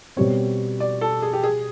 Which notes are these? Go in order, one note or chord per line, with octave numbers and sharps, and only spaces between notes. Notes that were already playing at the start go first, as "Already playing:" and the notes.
B2 G3 C4 C#5
D5
A4
G#4
G4
G#4